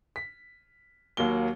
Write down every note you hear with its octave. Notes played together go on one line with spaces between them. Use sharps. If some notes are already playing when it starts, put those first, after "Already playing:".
B6
D#2 F#3 A#3 G7